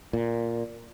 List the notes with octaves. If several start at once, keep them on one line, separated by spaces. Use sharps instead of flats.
A#2